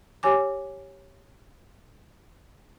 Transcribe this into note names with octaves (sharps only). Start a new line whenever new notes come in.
G4 C#5 G#5 D6